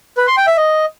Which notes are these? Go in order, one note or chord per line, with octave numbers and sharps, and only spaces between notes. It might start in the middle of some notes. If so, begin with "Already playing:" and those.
B4
C6
G5
E5
D#5